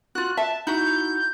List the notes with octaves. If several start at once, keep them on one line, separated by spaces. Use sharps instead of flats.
F4 F#4 F#6
E5 A5
D#4 E4 F#4 G6